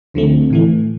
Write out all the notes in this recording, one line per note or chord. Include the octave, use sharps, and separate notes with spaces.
D2 D3 F3 A3 C4
A2 E3 A3